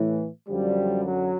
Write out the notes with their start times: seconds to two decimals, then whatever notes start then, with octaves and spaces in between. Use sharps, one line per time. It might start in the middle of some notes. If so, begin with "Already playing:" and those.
Already playing: A2 E3
0.49 F#2 D3 F3 G3
1.04 F#3